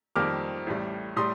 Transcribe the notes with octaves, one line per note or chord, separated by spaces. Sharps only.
F2 D#3 G3 A#3 D6 F6
A1 A2 G3
A2 G3 C6 D#6